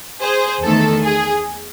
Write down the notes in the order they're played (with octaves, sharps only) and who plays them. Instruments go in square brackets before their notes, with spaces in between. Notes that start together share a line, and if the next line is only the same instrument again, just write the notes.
[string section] G#4 C5
E2 D#3 A3 A4
G#4